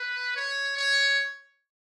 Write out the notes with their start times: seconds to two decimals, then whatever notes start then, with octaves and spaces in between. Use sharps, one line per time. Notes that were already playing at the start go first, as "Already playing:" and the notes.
Already playing: B4
0.36 C#5
0.77 C#5